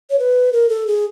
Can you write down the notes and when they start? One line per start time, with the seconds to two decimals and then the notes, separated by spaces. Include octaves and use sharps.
0.10 C#5
0.19 B4
0.53 A#4
0.69 A4
0.87 G#4